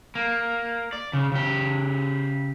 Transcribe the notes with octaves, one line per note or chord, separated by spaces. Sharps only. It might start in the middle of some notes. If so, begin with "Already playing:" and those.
A#3
D5
C#3
C#3 G4